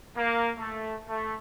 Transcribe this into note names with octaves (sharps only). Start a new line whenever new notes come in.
A#3
A3
A3